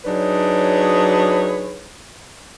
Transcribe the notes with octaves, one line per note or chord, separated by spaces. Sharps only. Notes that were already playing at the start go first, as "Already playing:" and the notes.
F#3 D4 D#4 G#4 B4 C#5